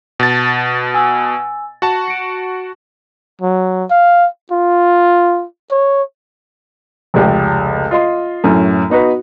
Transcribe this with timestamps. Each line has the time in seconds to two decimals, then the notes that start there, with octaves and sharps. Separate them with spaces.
0.20 B2 D#5 A5 A6
0.94 G#5 E6
1.82 F#4 A5
2.08 C#7 D7
3.42 F#3
3.90 F5
4.51 F4
5.71 C#5
7.14 F1 C#2 G4
7.91 F4 D#5 C6
8.44 F#2 A2 C#4
8.90 B3 D#4 F#4 B4